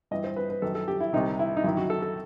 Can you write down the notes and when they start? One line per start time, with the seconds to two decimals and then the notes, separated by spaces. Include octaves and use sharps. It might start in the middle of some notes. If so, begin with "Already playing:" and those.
0.11 G2 E3 D#5
0.24 C5
0.36 B4
0.50 B4
0.62 F#2 D#3 A4
0.75 A4
0.88 G4
1.00 E4
1.13 C2 C3 D#3 D#4
1.39 E4
1.57 D#4
1.64 F#2 D#3 E4
1.77 F#4
1.90 A4
2.02 A4